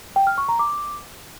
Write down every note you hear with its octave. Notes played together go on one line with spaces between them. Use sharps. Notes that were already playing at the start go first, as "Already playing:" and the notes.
G5
F6
C#6
A#5
D6